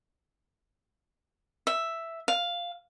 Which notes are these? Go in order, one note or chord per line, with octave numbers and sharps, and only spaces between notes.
E5
F5